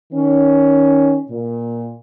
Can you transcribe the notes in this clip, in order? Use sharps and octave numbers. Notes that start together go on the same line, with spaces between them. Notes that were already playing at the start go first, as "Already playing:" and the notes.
D#3 C#4
A#2